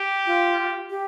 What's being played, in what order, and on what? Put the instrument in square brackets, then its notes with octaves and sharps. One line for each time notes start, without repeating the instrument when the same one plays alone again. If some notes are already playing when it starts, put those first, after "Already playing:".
Already playing: [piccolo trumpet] G4
[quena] F4
G4